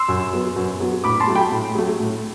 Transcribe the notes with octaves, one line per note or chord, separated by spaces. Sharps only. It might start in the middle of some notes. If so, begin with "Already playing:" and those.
Already playing: C6 E6
F#2
F#3 B3
F#2
F#3 B3
A2 B5 D6
A5 C6
F#3 A3
G5 B5
A2
F#3 A3
A2